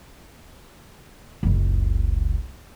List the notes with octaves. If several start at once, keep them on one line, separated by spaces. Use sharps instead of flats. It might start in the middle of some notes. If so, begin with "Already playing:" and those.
F#1 C#2